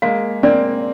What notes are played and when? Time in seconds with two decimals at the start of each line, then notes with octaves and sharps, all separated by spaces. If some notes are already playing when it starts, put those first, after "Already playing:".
0.02 G#3 A#3 F5
0.43 A#3 C4 D5